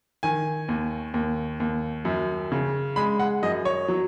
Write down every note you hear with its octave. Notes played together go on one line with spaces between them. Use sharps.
D#3 G#5
D#2
D#2
D#2
F#2
C#3
G#3 B5
F#5
F#2 D#5
C#5
F#3